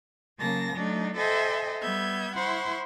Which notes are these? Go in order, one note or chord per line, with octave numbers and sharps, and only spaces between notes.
C#3 F#3 A#3 A5 A#6
F#3 A3 D4 D#4
A4 C5 D#5 E5 G5 G#5
G3 B3 E5 G6 G#6
E4 C5 F#5 C6 C#6